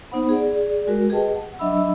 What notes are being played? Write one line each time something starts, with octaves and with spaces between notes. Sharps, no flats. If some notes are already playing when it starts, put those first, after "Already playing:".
B3 D#4 C5 F#5 B5
G#4 D5
G#3 F#4 A#4
G4 G#4 B4 D#5 G5 A5
F#5
F#3 D4 D#5 E5 B5 E6